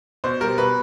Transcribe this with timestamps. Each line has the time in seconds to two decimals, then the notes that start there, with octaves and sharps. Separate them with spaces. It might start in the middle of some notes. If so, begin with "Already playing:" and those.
0.24 B2 C5
0.40 G3 A#4
0.58 B2 B4